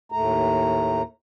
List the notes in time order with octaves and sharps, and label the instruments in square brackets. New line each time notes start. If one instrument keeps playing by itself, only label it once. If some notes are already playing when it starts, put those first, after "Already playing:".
[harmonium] D#2 A2 A3 A#5